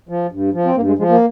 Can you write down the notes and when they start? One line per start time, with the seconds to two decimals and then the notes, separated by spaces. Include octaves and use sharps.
0.09 F3
0.32 G2
0.53 F3
0.65 C4
0.76 G2 A#3
0.87 G#3
0.98 F3 G#3
1.09 A#3